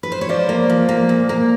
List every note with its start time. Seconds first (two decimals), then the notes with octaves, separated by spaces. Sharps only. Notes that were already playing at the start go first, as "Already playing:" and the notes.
0.03 B4
0.12 C5
0.21 C#5
0.29 F3 C5 D5
0.49 A#3
0.70 F3
0.89 A#3
1.09 A#2
1.29 A#3